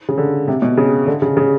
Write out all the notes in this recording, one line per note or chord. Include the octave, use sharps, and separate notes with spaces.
C#3
D3
C3
B2
C#3
D3
C#3
C#3